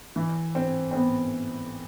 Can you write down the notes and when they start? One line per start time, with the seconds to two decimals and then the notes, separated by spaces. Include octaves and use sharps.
0.16 E3
0.55 C4
0.91 C4
0.95 B3